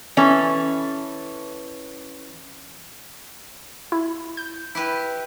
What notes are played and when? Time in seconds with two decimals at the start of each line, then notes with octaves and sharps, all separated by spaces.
0.17 E3 C#4 A4 B4
3.92 E4
4.37 G6
4.75 E4 G4 B4